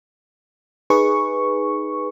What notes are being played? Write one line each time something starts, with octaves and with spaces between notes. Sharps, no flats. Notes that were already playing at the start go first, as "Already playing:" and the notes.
D#4 G#4 B4 C#6